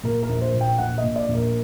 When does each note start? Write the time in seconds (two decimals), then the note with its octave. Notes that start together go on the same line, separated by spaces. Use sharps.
0.03 A#2 A#4
0.23 A#4
0.29 A#1
0.42 C5
0.54 A#2
0.61 G5
0.78 A#1 F#5
0.98 D#5
1.04 A#2
1.16 D5
1.29 A#1
1.35 A#4